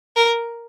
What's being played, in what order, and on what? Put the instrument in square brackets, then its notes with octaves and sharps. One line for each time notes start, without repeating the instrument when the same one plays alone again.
[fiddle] A#4